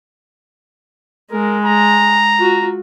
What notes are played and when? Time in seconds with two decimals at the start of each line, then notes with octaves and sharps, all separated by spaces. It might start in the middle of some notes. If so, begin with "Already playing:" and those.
1.32 G#3 A#4
1.65 A#5
2.38 F4 F#4